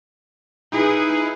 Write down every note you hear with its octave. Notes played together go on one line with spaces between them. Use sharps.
D#4 E4 G#4 B4